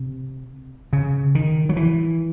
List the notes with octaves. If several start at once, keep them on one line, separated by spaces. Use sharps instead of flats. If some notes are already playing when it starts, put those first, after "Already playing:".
Already playing: C3
C#3
D#3
F#3
E3